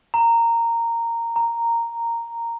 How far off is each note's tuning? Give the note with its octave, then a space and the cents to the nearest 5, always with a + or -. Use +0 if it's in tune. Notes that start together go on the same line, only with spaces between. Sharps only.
A#5 -10
A#5 -5